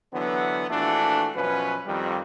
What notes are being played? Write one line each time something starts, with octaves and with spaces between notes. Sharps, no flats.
D3 E3 F#3 B3
A#1 E3 A3 D4 F#4 A4
F#2 B2 F3 C#4 B4
F2 D#3 G3